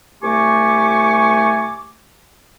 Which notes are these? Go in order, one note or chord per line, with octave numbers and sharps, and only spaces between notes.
C2 A3 G4 G#5 C#6 D6